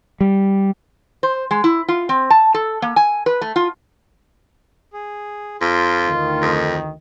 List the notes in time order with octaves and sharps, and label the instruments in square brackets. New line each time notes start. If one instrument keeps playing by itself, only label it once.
[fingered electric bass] G3
[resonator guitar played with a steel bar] C5
G#3
E4
F4
C4
A5
A4
A#3
G#5
B4
A3
F4
[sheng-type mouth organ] G#4
[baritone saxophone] F2 [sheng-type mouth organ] F4
[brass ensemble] D2 D#3
[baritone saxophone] F2